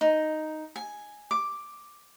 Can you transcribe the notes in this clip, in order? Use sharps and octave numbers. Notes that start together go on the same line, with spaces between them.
D#4
G#5
D6